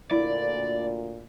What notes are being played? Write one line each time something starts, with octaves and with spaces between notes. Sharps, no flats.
D2 A#2 E4 D5